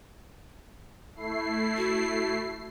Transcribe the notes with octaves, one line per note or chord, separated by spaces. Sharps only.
A3 E4 C7
F#4